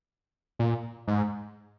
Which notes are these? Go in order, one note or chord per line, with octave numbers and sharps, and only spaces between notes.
A#2
G#2